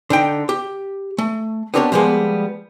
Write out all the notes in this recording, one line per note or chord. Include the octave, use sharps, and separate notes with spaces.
D3 D#4 G5
G4
A3
B3 C4 D4 G4 A#4 C#5
F3 G3 G#3 A#3 B3